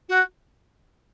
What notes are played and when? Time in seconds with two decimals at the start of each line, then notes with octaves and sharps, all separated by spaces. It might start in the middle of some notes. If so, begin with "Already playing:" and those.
0.08 F#4